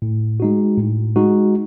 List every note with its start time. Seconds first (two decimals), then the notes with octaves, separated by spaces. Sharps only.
0.02 A2
0.40 G#3 D#4 F#4
0.78 A2
1.16 G#3 D#4 F#4